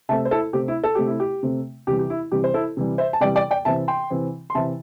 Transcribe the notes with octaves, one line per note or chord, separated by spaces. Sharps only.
C3 A3 C4 E5 A5
C5
E4 A4
C3 A3 C4 G4
E4
A4
C3 A3 C4 G4
E4
G4
C3 A3 C4
C3 E3 G3 G4
G4
E4
C3 E3 G3 G4
C5
E4 A4
C3 E3 G3
C5 E5
A5
C3 E3 G3 D5 G5
D5 G5
D5 G5
C3 E3 C4 E5 A5
G5 C6
C3 E3 C4
C6
C3 E3 C4 E5 A5